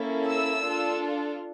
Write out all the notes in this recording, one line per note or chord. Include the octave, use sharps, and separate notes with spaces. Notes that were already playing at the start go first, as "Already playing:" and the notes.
Already playing: A#3 C#4 E4 A4
E6
D4 F4 A4